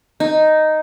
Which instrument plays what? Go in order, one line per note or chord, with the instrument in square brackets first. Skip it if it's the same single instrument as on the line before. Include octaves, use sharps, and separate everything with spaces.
[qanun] D#4